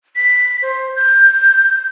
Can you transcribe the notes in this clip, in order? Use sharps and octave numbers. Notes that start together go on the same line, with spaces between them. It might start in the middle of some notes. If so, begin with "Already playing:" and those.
B6
C5
G6